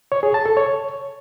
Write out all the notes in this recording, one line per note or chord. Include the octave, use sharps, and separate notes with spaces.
C#5
G#4
A5
A4
C#5